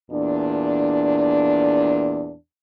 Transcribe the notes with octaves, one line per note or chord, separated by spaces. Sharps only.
E2 A#2 D4